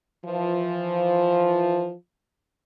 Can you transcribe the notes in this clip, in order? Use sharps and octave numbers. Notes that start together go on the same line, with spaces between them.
E3 F3